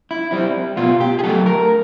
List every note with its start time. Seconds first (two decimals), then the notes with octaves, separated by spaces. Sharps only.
0.11 E4
0.31 G3 C4 E4
0.77 B2 F4
1.00 G4
1.19 G#4
1.24 F#3 A3 A4
1.46 A#4